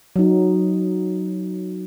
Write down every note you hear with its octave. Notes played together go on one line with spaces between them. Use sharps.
F#3 D#4